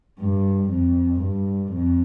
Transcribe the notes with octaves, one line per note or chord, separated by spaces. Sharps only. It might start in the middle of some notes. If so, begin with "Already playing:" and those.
G2
F2
G2
F2